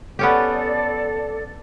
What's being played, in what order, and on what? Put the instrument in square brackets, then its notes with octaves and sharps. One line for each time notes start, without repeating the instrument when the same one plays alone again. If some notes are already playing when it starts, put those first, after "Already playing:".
[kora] B3 C#4 G4 [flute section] A4 D5